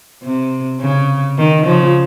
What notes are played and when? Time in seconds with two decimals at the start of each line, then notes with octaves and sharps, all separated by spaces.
0.23 C3
0.81 C#3
1.38 D#3
1.66 C#3 F3